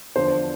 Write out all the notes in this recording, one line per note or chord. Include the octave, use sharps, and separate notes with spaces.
E2 D3 F3 C5